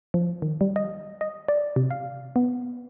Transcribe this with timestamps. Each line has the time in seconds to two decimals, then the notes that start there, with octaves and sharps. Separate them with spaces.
0.14 F3
0.42 D#3
0.61 G3
0.76 D#5
1.21 D#5
1.48 D5
1.76 C3
1.91 F5
2.36 B3